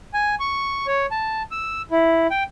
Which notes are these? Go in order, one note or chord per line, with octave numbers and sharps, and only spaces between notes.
G#5
C#6
C#5
A5
E6
E4
G5